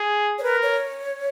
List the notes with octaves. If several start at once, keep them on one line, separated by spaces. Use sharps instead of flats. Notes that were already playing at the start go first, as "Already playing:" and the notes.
Already playing: G#4
C#5
A#4 B4
C#5